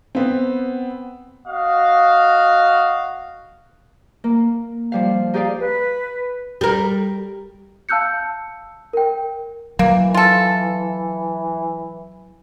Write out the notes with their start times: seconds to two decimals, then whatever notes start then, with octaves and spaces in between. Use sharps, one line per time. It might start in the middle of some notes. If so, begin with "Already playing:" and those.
0.15 B3 C4
1.47 F#4 D#5 F5
4.24 A#3
4.92 F3 G3 F5
5.34 D#4 G4 G#4 D5 F5
5.61 B4
6.61 G3 A#4
7.89 F5 A5 E6 F#6 G6 C#7
8.93 A#4 G5
9.79 E3 F#3 A#3
10.14 F4 A4